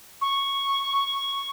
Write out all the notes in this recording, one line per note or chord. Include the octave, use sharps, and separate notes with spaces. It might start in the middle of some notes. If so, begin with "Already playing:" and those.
C#6